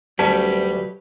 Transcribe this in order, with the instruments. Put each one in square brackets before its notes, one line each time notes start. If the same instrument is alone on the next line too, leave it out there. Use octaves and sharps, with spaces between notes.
[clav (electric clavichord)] D2 C#4 [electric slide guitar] F#3 G4 B4 [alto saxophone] G3 [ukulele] A5